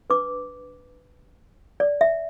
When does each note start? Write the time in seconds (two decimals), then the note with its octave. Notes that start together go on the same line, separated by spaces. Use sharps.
0.10 D4 B4 D6
1.80 D5
2.01 E5